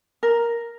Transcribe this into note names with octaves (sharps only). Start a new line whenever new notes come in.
A#4